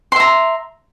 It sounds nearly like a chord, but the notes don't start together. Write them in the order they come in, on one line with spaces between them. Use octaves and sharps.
C6 E5 A#5